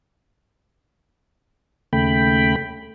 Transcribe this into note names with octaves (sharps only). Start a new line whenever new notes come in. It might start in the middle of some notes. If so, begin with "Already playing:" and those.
D#2 C#3 A3 G5 B5